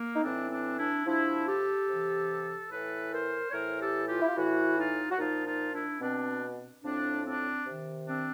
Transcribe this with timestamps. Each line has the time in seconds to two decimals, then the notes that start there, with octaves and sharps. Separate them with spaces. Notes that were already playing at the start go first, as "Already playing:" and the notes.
Already playing: A#3
0.16 D#4
0.23 A2 E3 C4 D4
0.51 C4 D4
0.78 D4 E4
1.06 C3 F3 D4 E4
1.48 G4 A4
1.89 C3 E3
2.72 A2 E3 A4 B4
3.13 A#4 C5
3.50 C#5
3.53 A2 E3 A#4 C5
3.81 G4 A4
4.08 F4 G4
4.21 E4
4.29 F4
4.36 A2 E3 E4 F#4
4.77 D#4 F4
5.11 F#4
5.18 A#2 F3 D#4 F4
5.46 D#4 F4
5.73 D4 E4
6.01 B2 C4 D4
6.83 A2 F3 C4 D4
7.26 C4 D4
7.66 C3 D#3
8.08 C4 D4